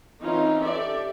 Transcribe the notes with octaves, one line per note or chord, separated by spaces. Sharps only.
E3 C4 C#4 D#4 F4
G4 A4 D5 E5